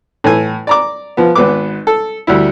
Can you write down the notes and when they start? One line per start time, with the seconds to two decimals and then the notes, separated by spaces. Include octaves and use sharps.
0.24 A2 E3 G#5
0.67 D5 A#5 D6
1.17 F3 B3
1.35 G#1 B3 B4 D6
1.87 A4
2.27 D2 G3 E4